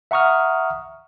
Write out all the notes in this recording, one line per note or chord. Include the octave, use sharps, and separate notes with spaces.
E5 F#5 A#5 C#6 D#6 F6